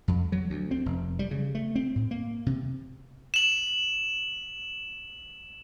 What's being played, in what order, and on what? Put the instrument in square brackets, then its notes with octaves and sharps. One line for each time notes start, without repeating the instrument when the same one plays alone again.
[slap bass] F2
F#3
D2
C4
F1
G3
C#3
A3
C4
A2
A#3
C3
[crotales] E7 F#7